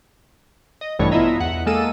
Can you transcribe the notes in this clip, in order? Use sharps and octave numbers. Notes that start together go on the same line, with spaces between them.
D#5
A1 G2 B2 E3 A3 C#5
B3 E4 F4 D#5 E5 A#5
E2 F#5
G#3 A#3 A4 E6 D#7